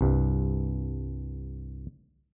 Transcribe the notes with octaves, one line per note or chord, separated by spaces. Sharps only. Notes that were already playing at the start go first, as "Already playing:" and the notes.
C2 G2